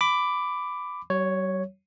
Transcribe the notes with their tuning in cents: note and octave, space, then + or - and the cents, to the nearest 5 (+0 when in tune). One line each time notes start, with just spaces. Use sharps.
B5 +15 D6 +0
G3 -45 C#5 +0